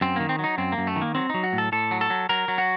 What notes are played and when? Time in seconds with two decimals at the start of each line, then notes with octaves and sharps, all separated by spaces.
0.01 F#2 C4
0.16 D#3 A#3
0.29 C4
0.39 F#3 D#4
0.58 F#2 C4
0.72 A#3
0.78 F#2
0.87 A3
0.96 D#3
1.01 A#3
1.15 F#3 C4
1.30 F#3 D#4
1.43 F#4
1.53 A2
1.58 A4
1.72 A2 A4
1.91 F#3
2.01 A4
2.10 F#3
2.29 F#3 A#4
2.48 F#3
2.58 F#4